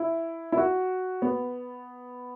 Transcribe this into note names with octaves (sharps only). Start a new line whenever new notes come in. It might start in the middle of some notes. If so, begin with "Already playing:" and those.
Already playing: E4
E4
F#4
B3